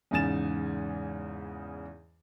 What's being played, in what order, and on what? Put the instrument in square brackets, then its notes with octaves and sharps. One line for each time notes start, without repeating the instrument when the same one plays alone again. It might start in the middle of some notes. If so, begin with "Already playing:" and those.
[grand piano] E2 G#2 C#3 G#5 A6 E7